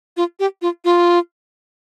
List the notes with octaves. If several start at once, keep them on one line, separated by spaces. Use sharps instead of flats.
F4
G4
F4
F4